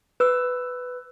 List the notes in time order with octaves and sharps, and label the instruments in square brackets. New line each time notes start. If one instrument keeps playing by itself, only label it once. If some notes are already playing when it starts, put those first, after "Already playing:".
[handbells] B4 E6